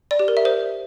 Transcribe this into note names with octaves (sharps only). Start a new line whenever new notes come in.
D5
G4
A#4
E5
C5